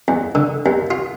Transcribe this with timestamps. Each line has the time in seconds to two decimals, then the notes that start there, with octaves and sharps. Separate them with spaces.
0.08 E2
0.35 D3
0.66 D#2
0.91 F4